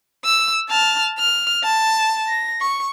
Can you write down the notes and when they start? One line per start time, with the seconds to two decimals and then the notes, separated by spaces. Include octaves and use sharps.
0.25 E6
0.69 A5 F6
1.19 F6
1.64 A5
2.28 A#6
2.61 C#6